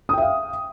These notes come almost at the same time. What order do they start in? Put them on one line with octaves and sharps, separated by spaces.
D#6 G5 E5 F5